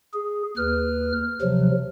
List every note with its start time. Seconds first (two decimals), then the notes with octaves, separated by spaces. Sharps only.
0.14 G#4
0.57 D#2 B4 F6
1.42 C3 F3 F#3